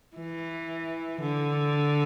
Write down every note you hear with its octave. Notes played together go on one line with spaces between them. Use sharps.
E3
D3